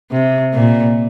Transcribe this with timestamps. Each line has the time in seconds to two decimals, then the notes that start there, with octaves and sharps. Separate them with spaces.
0.11 C3
0.54 A#2